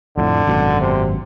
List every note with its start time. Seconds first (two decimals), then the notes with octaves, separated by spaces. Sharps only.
0.18 F2 A2 D3
0.47 G#1 F#2 B2
0.81 C3